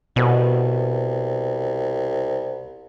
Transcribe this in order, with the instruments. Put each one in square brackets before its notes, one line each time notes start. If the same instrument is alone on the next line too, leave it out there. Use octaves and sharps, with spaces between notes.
[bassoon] C2 [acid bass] B2